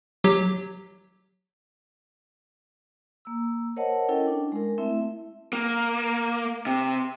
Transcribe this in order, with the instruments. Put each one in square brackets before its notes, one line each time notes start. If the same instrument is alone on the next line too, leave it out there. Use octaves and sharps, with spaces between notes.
[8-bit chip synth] F#3 G4
[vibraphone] A#3 E6
A#4 C5 C#5 D#5 F#5 A5
C#4 E4 A4 A#4 G5
D4
G#3 A#4
A3 C4 E4 E5
[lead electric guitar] A#3
C3